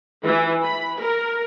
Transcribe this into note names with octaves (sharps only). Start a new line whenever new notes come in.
E3
B5
A#4